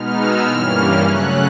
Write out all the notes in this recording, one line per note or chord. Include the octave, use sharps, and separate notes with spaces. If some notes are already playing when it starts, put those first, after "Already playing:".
Already playing: B2 G#3 B3 D#4 F6
E6
G2 E3 G3 A#3 C#4 F6
C#3 F#3 A3 C#4 F#6